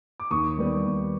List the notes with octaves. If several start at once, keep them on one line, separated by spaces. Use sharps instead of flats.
D6
D#2 C#6 D#6
D#3 G3 B3
D#2